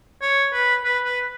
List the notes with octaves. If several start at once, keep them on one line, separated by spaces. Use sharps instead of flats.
C#5
B4
B4
B4